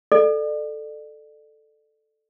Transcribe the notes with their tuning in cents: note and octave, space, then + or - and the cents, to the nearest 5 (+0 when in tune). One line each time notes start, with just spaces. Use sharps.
A4 +0 D5 +30